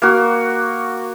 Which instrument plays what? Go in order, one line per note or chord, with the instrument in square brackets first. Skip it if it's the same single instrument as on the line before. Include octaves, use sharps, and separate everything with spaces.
[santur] A#3 F#4